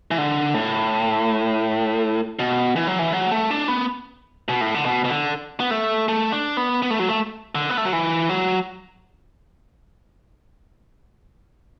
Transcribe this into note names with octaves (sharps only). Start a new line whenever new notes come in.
E3
D3
A2
B2
E3
F#3
E3
F#3
A3
D4
B3
B2
A2
D3
B2
B2
D3
B3
A3
A3
D4
B3
B3
A3
F#3
A3
D3
B3
A3
F#3
E3
F#3